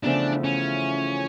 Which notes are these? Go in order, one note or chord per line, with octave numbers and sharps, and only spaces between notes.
E2 C#3 F3 A3 D4
C#4